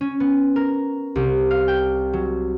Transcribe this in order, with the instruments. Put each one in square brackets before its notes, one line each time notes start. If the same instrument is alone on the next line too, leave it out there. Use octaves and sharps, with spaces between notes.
[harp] C#4
B3
A#4
C2
F5
G5
F#3